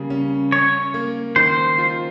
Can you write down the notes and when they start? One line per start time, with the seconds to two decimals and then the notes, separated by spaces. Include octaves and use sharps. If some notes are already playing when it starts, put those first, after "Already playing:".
Already playing: C#3 G3 A#3
0.10 C#4
0.52 C#4 C#5
0.94 A#3
1.36 D#3 C5
1.78 F4